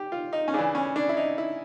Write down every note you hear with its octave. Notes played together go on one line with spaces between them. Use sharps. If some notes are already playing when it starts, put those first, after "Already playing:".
Already playing: G4
F4
D#4
C#4
C#3 E3 D4
C#4
D4
E4
D#4
E4